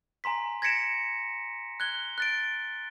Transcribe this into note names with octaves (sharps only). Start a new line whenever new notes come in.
G#5 A#5 C6 B6
G#6 A#6 B6 C#7 D7 E7
F#6 G#6 G7
F#6 A6 D7